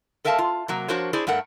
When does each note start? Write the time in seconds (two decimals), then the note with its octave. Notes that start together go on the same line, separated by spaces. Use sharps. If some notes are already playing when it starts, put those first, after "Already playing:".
0.25 A4 A#4 E5 F5 G#5 A5
0.39 F4
0.68 C3 F#3 A#3
0.88 F3 D4 F#4 A#4 C5 C#5
1.13 D4 E4 G#4 C5 D5
1.27 G2 A3 A#4 F#5